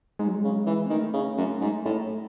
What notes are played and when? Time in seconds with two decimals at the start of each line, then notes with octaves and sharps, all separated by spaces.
0.19 G#2 G#3
0.27 F#3
0.36 G#3
0.44 C#3
0.66 E3
0.86 C4
0.90 D#3 A3
1.13 C#3
1.37 F#2
1.61 G#2
1.85 A2